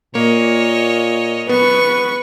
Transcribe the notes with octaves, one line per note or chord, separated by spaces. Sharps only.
A#2 A#3 C#5 D#5
B3 B4 C#6